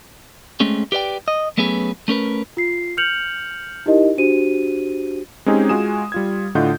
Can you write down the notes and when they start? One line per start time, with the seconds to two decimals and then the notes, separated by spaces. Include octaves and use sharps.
0.60 G#3 A3 C4 C#4 G#4
0.92 G4 B4 D5 G5
1.28 D#5
1.57 F#3 A3 B3 C#4 G#4 B4
2.08 A3 C#4 A#4 B4
2.57 F4 C7
2.97 F6 G6 C#7 F7 F#7
3.86 D#4 E4 G4 A#4 D#5
4.18 D4 F#4 G4 C5 D#7
5.46 G#3 C4 C#4 D#4 G4 G#4
5.69 G#3 F4 F#4 G#5 D#6 E7
6.12 G3 F4 G#6
6.55 A2 D3 F4 D#5 F#5 G6